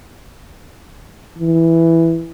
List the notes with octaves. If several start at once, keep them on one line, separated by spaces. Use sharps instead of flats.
E3